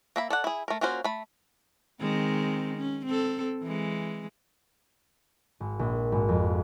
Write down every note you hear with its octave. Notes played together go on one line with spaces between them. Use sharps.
A#3 E5 B5
A4 D5 F#5
E4 G#4
A3 A#4
A#3 C#4 F4 F#4 C5
A3 B5
D#3 G#3 C4
C#4
C4 A4
E3 G#3
G#1
A#1
G#1
F2